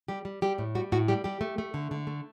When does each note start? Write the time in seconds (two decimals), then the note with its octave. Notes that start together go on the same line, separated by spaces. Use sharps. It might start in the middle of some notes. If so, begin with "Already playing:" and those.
0.08 G3 G4
0.25 G3
0.42 G3 G4
0.58 A2
0.75 G3 F#4
0.92 A2 F#4
1.08 G3 G4
1.24 G3 G4
1.41 A3
1.58 A3
1.74 D3
1.91 D3
2.07 A3